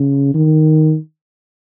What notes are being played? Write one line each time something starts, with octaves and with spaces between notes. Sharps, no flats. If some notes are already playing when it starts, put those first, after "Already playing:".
Already playing: C#3
D#3